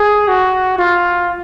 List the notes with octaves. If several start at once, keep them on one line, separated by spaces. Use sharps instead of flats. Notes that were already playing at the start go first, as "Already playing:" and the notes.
Already playing: G#4
F#4
F4